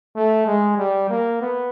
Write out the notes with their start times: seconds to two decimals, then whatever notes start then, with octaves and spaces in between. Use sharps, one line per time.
0.16 A3
0.46 G#3
0.78 G3
1.09 A#3
1.42 B3